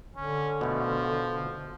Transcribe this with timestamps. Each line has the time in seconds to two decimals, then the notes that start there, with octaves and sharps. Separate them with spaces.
0.16 D3 C#4
0.61 B2 F3 A3